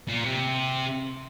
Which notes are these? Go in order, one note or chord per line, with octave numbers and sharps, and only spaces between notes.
A#2
C3